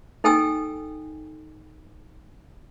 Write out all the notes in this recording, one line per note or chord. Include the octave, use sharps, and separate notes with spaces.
D#4 A4 G5 G#5 E6